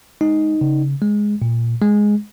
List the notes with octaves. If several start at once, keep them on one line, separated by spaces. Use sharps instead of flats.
G#3 D#4
C#3
G#3
A#2
G#3